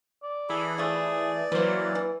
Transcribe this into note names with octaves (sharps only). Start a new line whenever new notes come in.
D5
E3 G#4 A4 B5
F3 A3 G#4 D5
E3 F#3 A#3 B4 C5
E3